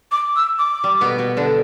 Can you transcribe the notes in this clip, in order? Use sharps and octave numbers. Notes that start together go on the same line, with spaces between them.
D6
E6
D6
G3
B2 B3
B2 B3
D3 D4